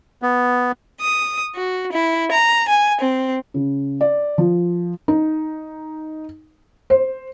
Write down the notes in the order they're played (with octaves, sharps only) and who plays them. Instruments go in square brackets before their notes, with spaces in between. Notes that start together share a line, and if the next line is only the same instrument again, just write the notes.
[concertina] B3
[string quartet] D#6
F#4
E4
A#5
G#5
C4
[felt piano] C#3
D5
F3
D#4
C5